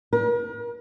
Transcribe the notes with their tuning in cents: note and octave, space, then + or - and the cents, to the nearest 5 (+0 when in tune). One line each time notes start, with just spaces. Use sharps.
A#4 +40